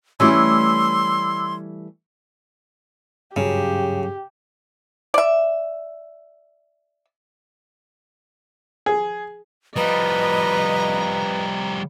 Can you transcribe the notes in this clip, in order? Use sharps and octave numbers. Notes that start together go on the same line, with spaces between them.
E3 G3 A3 C#4 E4 C6 D6 E6
G2 C#3 F#3 C#4 G4 F5
D5 E5
G#4
F3 G3 B4 D#5 A#5